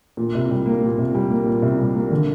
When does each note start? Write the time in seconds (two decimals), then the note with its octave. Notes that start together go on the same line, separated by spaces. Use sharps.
0.17 A#2
0.35 C2
0.51 G3
0.66 A#3
0.83 A#2
0.98 C2
1.15 G3
1.30 A#3
1.46 A#2
1.62 C2
1.79 G3
1.95 A#3
2.11 D3